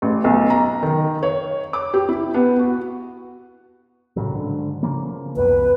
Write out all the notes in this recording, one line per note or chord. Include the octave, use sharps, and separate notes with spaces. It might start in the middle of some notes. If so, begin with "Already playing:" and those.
A1
B1
A#5
D#3
C#5
D6
G4
E4
B3
F#4
A2 C#3 F#3
G#2 D3
C#3 F3 A#3
C#2 F#2 B2 B4